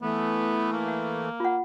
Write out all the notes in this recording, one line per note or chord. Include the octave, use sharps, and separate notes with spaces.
E3 A3 B3
A#3
F5
F4 F#5